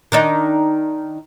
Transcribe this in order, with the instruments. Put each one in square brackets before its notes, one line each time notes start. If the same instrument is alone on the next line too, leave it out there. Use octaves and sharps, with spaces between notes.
[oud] D#3 D4 D#4